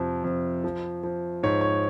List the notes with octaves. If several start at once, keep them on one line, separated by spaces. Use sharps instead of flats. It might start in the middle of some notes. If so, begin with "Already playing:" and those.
Already playing: F2 C3 F3
F2
F3
F3
G#2 C#5
C#5